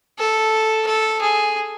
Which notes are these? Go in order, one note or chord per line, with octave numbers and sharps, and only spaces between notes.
A4
A4
G#4